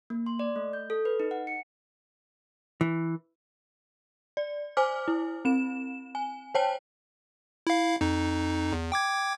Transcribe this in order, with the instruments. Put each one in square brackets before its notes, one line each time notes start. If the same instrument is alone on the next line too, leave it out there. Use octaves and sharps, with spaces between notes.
[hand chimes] A#3
C6
D5
A3
G6
A4
B4
D#4
F#5
C#7
[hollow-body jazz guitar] E3
[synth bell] D5
C5 G#5 D6 F6
E4
C4 E7
G#5
C5 C#5 G5 A5
[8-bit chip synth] E4 F5
F2 D#4
E2
G5 D6 G#6